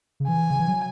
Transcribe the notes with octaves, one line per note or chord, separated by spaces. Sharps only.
C#3
E3 G#5
C#3
E3
F#3